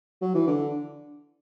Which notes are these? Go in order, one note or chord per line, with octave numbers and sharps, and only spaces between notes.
F#3
E3
D3